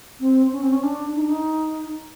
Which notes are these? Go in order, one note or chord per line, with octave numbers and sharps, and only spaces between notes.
C4
C#4
C4
C#4
D4
D#4
D4
D#4